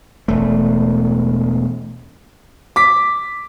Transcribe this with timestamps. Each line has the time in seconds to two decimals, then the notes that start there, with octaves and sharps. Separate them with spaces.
0.28 E1 A3
2.76 D6 B6